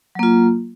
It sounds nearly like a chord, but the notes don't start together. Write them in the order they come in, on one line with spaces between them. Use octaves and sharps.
F#3 A#3 F4